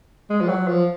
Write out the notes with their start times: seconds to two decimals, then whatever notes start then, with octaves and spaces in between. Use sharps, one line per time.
0.30 G#3
0.41 F3
0.49 F#3
0.67 F3